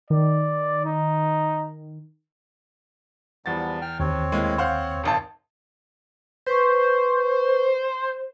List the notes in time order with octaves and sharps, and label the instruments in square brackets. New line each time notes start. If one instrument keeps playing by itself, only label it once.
[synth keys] D#3 [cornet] D5
[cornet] D#4
[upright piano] E2 A6 [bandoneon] F3 G3 B3
[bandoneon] G5 F6
[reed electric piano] D#2 [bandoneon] C4 C#5
[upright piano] A2 G#3 A#3
C5 F5 F#5
D#1 G#1 A5
[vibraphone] B4 C#6 [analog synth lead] C5